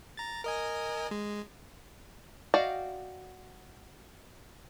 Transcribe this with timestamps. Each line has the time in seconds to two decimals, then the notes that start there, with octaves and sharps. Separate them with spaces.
0.17 A#5 A6
0.44 A#4 D#5 G#5
1.11 G#3
2.54 F#4 D5 D#5 F5 G5